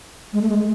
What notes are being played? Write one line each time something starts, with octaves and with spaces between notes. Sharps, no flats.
G#3
A3
G#3